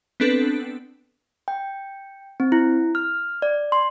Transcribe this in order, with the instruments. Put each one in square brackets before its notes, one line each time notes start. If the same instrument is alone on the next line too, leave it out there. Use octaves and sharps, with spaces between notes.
[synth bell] B3 C4 D4 A4 B4
[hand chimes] G5
C4
E4
F6
D5
C6